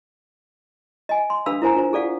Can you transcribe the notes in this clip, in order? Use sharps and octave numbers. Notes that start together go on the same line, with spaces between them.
D#5 G#5
C6
D4 A4 B4 F5 B5 E6
E4 A#4 C5 G#5 A#5
D4 F4 C5
G#4 A4 D5 F5 F#5